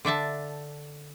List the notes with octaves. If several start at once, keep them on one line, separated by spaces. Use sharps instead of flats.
D3 D4 E5 A5